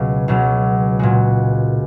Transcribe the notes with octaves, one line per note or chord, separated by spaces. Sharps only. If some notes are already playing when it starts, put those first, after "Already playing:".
Already playing: C#2 B2 F#3 F4
C#2 B2 F#3
A#2 G#3 F#4